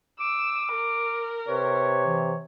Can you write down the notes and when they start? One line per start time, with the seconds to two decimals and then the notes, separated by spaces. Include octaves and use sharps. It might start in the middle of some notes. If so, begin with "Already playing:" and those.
0.20 D6 E6
0.72 A#4
1.48 C3 B4 C#5
2.06 E3